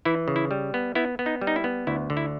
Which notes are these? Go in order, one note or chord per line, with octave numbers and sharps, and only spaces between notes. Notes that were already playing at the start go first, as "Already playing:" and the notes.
E3 E4
C#3
E4
G3
B3
B3 E4
B3
D#4
G3
D#4
E4
B3
D2 E4
D3
E4